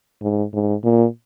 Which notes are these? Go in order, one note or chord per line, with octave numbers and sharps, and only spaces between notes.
G#2
G#2
A#2